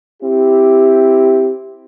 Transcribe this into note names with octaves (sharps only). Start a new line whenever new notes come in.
C4 E4 G4